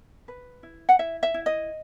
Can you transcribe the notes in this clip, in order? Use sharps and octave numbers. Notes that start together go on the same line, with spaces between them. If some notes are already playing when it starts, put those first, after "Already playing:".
B4
E4
F#5
E4 E5
E5
E4
D#5